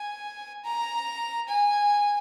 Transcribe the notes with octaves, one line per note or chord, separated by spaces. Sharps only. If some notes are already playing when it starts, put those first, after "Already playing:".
Already playing: G#5
A#5
G#5